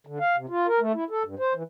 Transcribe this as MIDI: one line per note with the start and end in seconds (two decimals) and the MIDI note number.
0.07 0.19 50
0.20 0.36 77
0.36 0.46 48
0.49 0.67 65
0.67 0.80 70
0.80 0.92 57
0.94 1.04 64
1.10 1.23 69
1.23 1.35 43
1.39 1.53 72
1.54 1.63 52